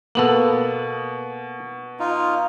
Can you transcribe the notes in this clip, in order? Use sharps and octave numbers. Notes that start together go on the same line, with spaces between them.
B2 A#3 B3 A4 F#7
D#4 F4